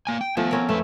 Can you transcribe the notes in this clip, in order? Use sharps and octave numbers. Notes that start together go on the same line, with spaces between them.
A#3 G#5
G5
F3 A3 B3 G#5
C4 C#4 A#4
F2 A3 B4